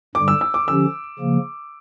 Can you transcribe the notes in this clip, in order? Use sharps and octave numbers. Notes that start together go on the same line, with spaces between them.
G2 D3 G3 D6
E6
E6
D6
D3 F3 C#4 G4 E6
C#3 F3 A#3